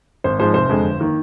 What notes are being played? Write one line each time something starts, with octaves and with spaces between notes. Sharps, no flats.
G#1 C5
G#2 F3 G#3 C5
F1 C5
F2 D3 G#3
G1
D#3 A#3